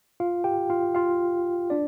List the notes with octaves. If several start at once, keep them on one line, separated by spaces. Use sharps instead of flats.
F4 F5
G4 G5
F4 F5
F4 F5
D4 D5